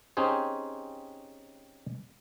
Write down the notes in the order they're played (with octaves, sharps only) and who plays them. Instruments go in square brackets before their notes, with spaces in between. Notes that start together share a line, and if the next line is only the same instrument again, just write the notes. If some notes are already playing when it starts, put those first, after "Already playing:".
[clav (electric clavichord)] C4 C#4 D#4 G4 G#4 C5